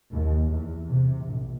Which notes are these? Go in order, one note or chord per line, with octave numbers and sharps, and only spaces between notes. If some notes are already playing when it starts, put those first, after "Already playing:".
D#2
E2
C3
A#1